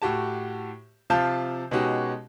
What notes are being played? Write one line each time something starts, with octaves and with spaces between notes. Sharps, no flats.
A2 F#4 G4 A5
C3 F3 F5 A5 G6
B2 G#3 C#4 D#4 F#4 G4